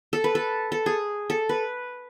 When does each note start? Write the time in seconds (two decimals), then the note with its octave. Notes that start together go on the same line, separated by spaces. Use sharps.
0.13 A4
0.24 B4
0.35 A4
0.72 A4
0.86 G#4
1.30 A4
1.49 B4